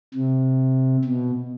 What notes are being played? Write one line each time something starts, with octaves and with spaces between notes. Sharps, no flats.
C3
B2